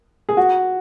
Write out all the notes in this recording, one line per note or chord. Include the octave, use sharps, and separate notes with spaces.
G#4
F#4